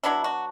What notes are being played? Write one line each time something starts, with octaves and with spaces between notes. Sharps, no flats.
F#3 B3 D4 E4
F#4